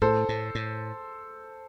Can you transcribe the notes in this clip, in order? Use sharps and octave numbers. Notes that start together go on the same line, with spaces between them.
A2 A4 C5
A2
A2